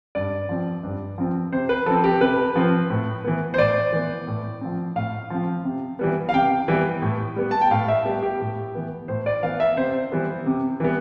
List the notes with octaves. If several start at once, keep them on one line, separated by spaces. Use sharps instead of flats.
G2 D5
F3 C4
G2
F3 C4
C3 C5
B4
F3 C4 A4
G4
C3 B4
F3 C4
A2
E3 B3
C5
A2 D5
E3 B3
A2
F3 C4
A2 F5
F3 C4
C3
E3 G3 B3
F5
C3 G5
E3 G3 B3
A2
G3 B3
A5
G5
A2 F5
E5
G3 B3 G4
G4
A2
E3 B3
A2 C5
D5
E3 B3 F5
E5
C3 C5
E3 G3 B3
C3
E3 G3 B3